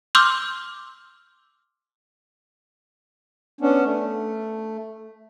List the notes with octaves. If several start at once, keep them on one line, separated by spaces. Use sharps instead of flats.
C6 D6 E6 F6 G6
B3 C#4 D4
A3